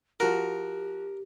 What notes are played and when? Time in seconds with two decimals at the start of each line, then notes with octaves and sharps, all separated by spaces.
0.20 F3 F#4 G4 A#4